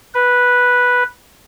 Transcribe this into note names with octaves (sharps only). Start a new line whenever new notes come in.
B4